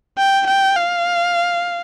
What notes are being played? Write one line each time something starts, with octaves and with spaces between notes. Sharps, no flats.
G5
G5
F5